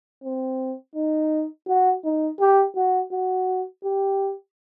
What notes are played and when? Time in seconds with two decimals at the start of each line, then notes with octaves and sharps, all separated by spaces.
0.24 C4
0.95 D#4
1.68 F#4
2.05 D#4
2.40 G4
2.76 F#4
3.12 F#4
3.84 G4